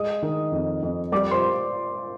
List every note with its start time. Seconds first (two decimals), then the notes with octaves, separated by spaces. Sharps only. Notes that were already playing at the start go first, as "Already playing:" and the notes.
Already playing: G#3 D#5 D#6
0.22 D#3
0.52 F2
0.82 F2
1.12 G3 D5 D6
1.31 C5 C6